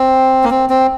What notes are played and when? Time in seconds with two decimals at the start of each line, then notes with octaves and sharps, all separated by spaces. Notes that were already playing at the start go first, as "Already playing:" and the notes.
Already playing: C4
0.44 A#3
0.50 C4
0.70 C4